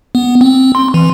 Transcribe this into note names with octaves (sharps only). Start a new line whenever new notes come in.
B3
C4
C6
E3